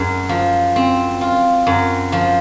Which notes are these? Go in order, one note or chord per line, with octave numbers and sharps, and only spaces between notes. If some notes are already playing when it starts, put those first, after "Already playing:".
Already playing: F#2 G#3
F3
C4
F4
F#2
F3